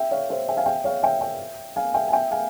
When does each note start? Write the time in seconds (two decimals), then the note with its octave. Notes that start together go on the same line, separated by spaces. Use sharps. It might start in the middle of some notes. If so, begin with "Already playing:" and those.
Already playing: E5 G5
0.11 C#5 F5
0.30 C5 E5
0.49 E5 G5
0.57 F5 G#5
0.66 E5 G5
0.84 C#5 F5
1.03 E5 G5
1.21 E5 G5
1.76 F5 G#5
1.94 E5 G5
2.08 G#5
2.12 E5 G5
2.31 F5 G#5